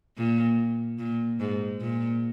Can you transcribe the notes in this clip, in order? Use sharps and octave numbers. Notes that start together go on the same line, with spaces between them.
A#2
A#2
G#2
A#2